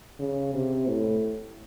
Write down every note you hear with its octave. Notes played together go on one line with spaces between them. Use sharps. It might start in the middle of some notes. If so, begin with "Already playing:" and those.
C#3
C3
A2